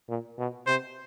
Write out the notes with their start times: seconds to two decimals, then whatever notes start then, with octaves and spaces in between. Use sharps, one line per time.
0.09 A#2
0.38 B2
0.67 C3 C5